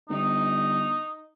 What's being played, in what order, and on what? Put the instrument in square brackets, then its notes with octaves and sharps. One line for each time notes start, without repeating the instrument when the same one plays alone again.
[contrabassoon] G1 [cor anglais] D#4